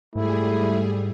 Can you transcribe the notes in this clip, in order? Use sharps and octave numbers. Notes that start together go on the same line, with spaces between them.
G#2 G3 A3 E4 G#4